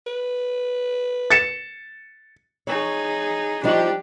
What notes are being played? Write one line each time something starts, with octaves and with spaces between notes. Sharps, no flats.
B4
A6 C#7 E7
D#4 G#4 C#5
F3 G3 D4 D#4 G4